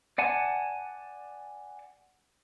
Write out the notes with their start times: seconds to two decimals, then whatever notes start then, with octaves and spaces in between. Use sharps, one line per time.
0.18 D5 F#5 G#5 A5